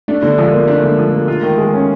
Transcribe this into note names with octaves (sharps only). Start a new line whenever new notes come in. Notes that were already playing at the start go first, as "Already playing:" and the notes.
A3 D4
D3
F3 G#3
A#3
A3 D4
D3
F3
A#3
F4
D#3
G#3
C#4